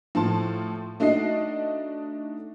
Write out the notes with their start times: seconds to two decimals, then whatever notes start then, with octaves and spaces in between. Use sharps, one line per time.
0.15 A2 F3 A5 C6
1.00 A3 D4 D#4 F#4 D#5 C7